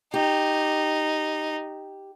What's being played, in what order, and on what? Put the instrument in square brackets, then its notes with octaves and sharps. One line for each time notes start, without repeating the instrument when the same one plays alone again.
[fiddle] D#4 [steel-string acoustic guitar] G4